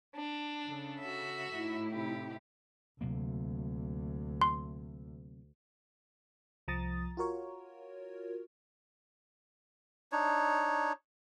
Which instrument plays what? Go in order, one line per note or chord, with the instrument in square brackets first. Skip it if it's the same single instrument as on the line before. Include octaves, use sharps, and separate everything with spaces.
[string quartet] D4
[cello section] C#3 A4
[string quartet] F#4 E5
[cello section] A2 D#4 E4
[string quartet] C3 G4
[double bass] D2 [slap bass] C3 F#3 A#3
[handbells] C6
[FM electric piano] C2 F3 A#5 D#6 A6
F4 F#4 A#4 C#5
[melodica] D4 D#4 C#5